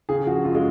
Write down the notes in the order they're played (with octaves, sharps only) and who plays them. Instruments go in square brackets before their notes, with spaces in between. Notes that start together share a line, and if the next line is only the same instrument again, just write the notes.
[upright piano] C#3 G#4
F3 F#4
F#2 F4
G#3